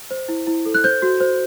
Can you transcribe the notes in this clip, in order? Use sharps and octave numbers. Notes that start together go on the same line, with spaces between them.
C5
E4
E4
A4
F#6
C5 G6
F#4
C5